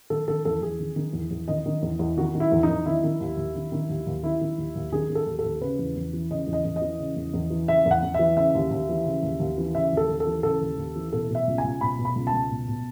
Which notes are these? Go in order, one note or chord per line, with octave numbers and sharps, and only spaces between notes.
D#3 A4
D#3 A4
E2 A4
E2 G#4
D#3
D#3
E2
E2
D#3 D#5
D#3
E2
E2
D#3 F#4
D#3
E4
E2
D#4
E2
D#3 E4
D#3
D#2
D#2
D#3
D#3
D#2
D#2
D#3 E4
D#3
D#2
D#2
D#3 G#4
D#3
A4
D#2
A4
D#2
C#3 B4
E2
E2
E3
C#3 D#5
E2
D#5
E2
D#5
E3
C#3
E2
E2
E3
C#3 E5
E2
F#5
E2
E3 E5
C#3 E5
D#2
D#2
E3
C#3
D#2
D#2
E3
C#3 E5
D#2 A4
D#2
A4
E3
C#3 A4
D#2
D#2
E3
B2 A4
B2
E5
C#2
G#5
C#2
B2 B5
B2
B5
C#2
A5
C#2
B2
B2